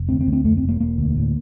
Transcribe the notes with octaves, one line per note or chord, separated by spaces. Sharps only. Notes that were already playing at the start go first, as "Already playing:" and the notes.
Already playing: F1
D2 C4
C4
D2
C4
F2 A3
C4
F1
A#3
E1 A#3
D2
A2